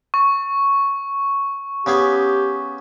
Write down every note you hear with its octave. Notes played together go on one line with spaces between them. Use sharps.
C#6
C#3 B3 G4 G#4